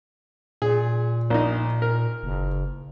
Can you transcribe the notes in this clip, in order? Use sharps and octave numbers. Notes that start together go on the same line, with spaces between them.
A#2 G#4
A#1 D#4
A#4
F#1